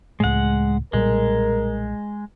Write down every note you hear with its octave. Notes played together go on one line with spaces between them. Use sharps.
C#2 A2 G#3 F#5
B1 A#2 G3 G#3 A#4